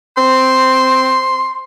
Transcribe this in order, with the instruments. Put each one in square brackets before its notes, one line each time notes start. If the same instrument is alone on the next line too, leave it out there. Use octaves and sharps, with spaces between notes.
[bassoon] C4 [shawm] C6